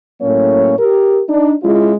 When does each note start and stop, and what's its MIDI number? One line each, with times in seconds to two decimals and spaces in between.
0.21 0.74 45
0.21 0.74 54
0.21 0.74 58
0.21 0.74 61
0.21 0.74 73
0.79 1.20 67
0.79 1.20 70
1.28 1.53 62
1.28 1.53 63
1.63 1.93 56
1.63 1.93 61
1.63 1.93 64
1.63 1.93 65